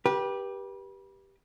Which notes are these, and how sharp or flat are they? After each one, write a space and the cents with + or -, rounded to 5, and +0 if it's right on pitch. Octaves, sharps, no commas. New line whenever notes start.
G4 +0 B4 -30